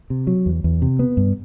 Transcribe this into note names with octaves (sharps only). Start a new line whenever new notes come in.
C3
F#3
E2
E2
C3
B3
G2